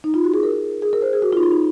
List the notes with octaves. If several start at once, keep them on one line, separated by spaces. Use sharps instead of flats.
D#4
F4
F#4
G#4
A#4
G#4
A#4
C5
G#4
F#4
F4
D#4
F4
D#4